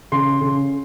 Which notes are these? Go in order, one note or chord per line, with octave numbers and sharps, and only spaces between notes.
C#3 C6
C#3